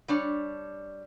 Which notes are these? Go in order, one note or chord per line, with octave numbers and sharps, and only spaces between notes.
G3 D4 C#5